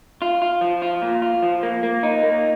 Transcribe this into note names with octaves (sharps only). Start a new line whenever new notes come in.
F4
F4
F3
F4
A#2
F4
F3
A#3
A#3
D#4
A#3